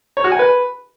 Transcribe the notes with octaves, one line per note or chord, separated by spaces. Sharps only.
C#5
F#4
G#5
B4